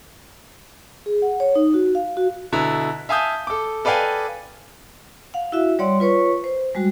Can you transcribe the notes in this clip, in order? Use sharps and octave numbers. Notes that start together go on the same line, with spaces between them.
G#4
F#5
C#5
D#4
F#4
F5
F#4
B2 D3 E4 A#5
E5 F5 G#5 A5 D#6 G6
A4 D6
A4 B4 D5 F5 G5 G#5
F5 F#5
E4 F#4 E5
G3 C#5 D5 F#5 C6
F4 B4 C#5 C#6
C5
G3 G#3 F#4